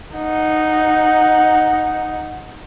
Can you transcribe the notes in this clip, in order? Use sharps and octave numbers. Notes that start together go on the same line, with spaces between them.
D#4 F#5